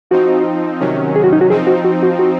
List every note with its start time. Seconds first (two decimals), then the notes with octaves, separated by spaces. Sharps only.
0.11 F3 C4 D#4 F#4
0.80 C3 D#3 F#3 C#4
1.16 G#4
1.24 F#4
1.33 D#4
1.41 F#4
1.50 F3 C4 D#4 G#4
1.67 F#4
1.84 F#4
2.03 F#4
2.19 F#4